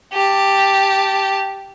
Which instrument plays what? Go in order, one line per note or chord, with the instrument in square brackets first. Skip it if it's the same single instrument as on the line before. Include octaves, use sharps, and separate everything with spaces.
[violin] G4 A5